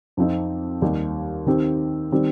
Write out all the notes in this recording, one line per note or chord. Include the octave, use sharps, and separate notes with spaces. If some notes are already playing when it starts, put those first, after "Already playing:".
F2 F3 C4 D#4
D#2 D#3 G3 D#4 G4
D#3 C4 G4
D#3 G3 C4